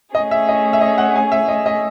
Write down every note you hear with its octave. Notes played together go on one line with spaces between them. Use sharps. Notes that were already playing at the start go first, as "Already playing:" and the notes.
A3 C#4 G#4 D#5
E5
D#5
E5
D#5
F#5
G#5
E5
D#5
D#5